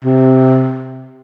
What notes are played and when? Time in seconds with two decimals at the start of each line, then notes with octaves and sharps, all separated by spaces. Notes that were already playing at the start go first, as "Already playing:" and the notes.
0.04 C3